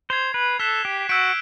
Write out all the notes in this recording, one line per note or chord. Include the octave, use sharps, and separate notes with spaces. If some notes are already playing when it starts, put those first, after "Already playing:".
C5 G#6 C7 F7
B4
A4 F#6 B6 E7 G7
G4
F#4 E6 G6 B6 D7